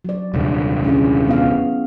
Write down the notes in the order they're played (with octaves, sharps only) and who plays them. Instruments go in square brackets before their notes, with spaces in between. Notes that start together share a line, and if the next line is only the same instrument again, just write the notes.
[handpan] F#3 D5
[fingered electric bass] D#1 C2 D3
[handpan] C#4 E4 G#4
B3 F5